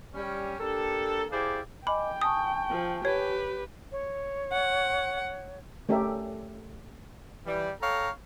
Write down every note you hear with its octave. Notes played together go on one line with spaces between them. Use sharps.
G3 C#4
A#3 D4 G4 A4
E4 G4 G#4 C5 D5 F5
D#5 G5 G#5 B5 D6
G#5 A5 C#6 D#6
F3
G4 B4 C#5
C#5
F#5
A3 C#4 G4 A4 A#4 E5
E3 G3
A4 C#5 F5 G5 A#5